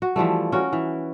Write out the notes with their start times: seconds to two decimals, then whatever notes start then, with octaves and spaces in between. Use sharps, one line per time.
0.02 F#4
0.16 E3 F3 G3 A3
0.52 C#4 F#4 A#4
0.73 E3